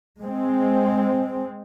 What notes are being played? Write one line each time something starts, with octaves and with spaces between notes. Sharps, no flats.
G#3 C4